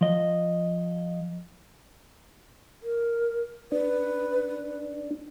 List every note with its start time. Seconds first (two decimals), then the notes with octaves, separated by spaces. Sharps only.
0.01 F3 D#5
2.83 A#4
3.72 D4 B4